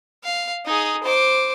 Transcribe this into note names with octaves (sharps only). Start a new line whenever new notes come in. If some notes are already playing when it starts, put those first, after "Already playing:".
F5
D#4 G#4
C5 D6